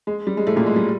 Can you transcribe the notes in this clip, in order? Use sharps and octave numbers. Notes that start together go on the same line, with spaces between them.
G#3
G3
G#3
A2 A3
A#2 A#3
G#3
G3